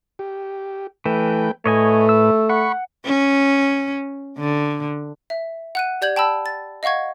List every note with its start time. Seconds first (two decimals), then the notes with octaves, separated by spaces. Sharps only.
0.19 G4
1.06 E3 A3 B4 G5
1.66 A2 A3 B4 C#5 D#5 G#5
2.09 E6
2.49 F#5 B5 C#6
3.05 C#4
4.39 D3
5.30 E5
5.75 F#5 F#6 D#7
6.01 G4 D5 G6 G#6 F#7
6.16 G5 A5 B5 E6
6.46 A6
6.83 D#5 F5 F#5 C#6 G#6